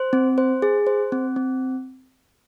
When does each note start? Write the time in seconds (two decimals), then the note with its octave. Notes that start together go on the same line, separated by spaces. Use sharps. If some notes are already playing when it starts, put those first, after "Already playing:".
Already playing: C5
0.13 C4
0.38 C5
0.62 G#4
0.87 C5
1.12 C4
1.36 C4